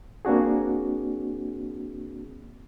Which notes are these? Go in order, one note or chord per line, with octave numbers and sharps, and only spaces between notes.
A#3 C4 D4 F#4 G#4